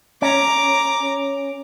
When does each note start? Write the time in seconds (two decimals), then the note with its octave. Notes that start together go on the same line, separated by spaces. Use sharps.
0.22 C#4 A#5 D6